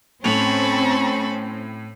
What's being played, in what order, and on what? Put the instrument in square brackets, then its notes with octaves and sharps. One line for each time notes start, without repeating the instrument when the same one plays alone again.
[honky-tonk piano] A2 F7 [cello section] C4 [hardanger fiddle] C#4 [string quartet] A5 B5 C#6